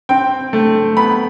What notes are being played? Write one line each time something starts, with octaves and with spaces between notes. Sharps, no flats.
C4 G5
A3
B3 B5